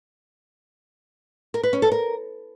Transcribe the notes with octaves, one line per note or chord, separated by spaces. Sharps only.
A#4
B4
C#4
A4
A#4